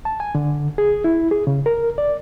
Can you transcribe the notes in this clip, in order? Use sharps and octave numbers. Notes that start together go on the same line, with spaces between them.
A5
G#5
D3
G#4
E4
G#4
C#3
A#4
D5